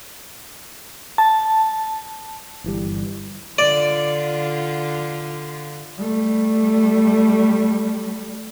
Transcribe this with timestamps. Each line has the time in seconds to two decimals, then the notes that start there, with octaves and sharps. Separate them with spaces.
1.18 A5
2.64 G1 E3 G3
3.58 D3 F4 D5
5.99 G3 A3